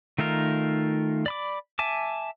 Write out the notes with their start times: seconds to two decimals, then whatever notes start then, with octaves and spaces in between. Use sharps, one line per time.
0.18 D#3 A3 D#4 F4 A#4
1.26 D5 B5 D6
1.79 E5 G#5 A5 D6